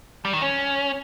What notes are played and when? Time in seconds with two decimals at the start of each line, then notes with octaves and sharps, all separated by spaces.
0.25 G3
0.33 D#3
0.42 C#4